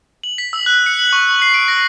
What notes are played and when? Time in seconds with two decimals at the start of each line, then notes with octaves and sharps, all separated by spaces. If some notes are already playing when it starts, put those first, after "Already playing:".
0.24 F#7
0.38 B6
0.53 E6
0.66 F#6
0.86 C#7
0.99 F#7
1.13 C#6
1.42 C7
1.54 D7
1.68 A#6